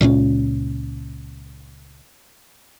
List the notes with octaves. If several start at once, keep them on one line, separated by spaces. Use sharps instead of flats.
C#2 A#2 F3 C#4